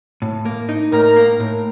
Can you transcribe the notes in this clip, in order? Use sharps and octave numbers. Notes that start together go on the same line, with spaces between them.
A2
A#3
D#4
A2 A#4
A#3
A2